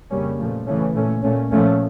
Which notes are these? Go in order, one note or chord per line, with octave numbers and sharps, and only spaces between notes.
F2 C#3 G3 A#3 C#4
A#2 F3 A3
C#3 E3 A3 C#4
A#2 A3 C#4
A#2 A3 C#4
A#2 F3 A3 C#4